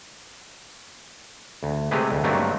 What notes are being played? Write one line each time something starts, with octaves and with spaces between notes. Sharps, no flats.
D2
C3 G#3 A3 G4 G#4 B4
D2
G2 D#3 F#3 A3 A#3 C4